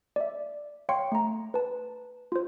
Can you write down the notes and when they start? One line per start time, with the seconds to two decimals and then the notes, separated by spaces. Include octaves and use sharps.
0.16 D5 E5
0.89 C#5 F5 G5 C6 C#6 C#7
1.12 A3 A#5
1.54 B4 A5
2.32 F4 C5